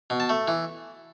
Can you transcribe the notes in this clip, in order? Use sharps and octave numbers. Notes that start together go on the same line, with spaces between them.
B2
A5
A3
E3